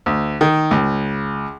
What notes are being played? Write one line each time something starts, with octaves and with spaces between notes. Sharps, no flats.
D2
D#3
C#2